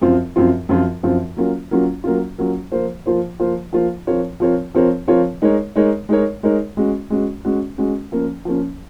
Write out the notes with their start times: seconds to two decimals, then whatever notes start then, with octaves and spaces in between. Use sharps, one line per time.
0.01 F#2 F3 C4 F4
0.36 F#2 F3 C4 F4
0.69 F#2 F3 C4 F4
1.03 F#2 F3 C4 F4
1.37 F#3 A#3 C#4 F4
1.71 F#3 A#3 C#4 F4
2.04 F#3 A#3 C#4 F4
2.38 F#3 A#3 C#4 F4
2.72 F3 A#3 F4 C5
3.06 F3 A#3 F4 C5
3.39 F3 A#3 F4 C5
3.73 F3 A#3 F4 C5
4.07 F3 C4 F4 A#4 C#5
4.40 F3 C4 F4 A#4 C#5
4.74 F3 C4 F4 A#4 C#5
5.08 F3 C4 F4 A#4 C#5
5.42 G#3 D#4 A#4 C#5
5.76 G#3 D#4 A#4 C#5
6.09 G#3 D#4 A#4 C#5
6.43 G#3 D#4 A#4 C#5
6.77 G#3 C#4 F#4
7.10 G#3 C#4 F#4
7.45 G#3 C#4 F#4
7.78 G#3 C#4 F#4
8.12 F3 A#3 C#4
8.45 F3 A#3 C#4